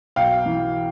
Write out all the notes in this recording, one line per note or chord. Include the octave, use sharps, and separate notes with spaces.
B1 F5 G5
E3